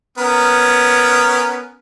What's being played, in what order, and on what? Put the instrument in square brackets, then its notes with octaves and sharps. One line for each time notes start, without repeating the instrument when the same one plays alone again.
[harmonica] B3 C#4 A#4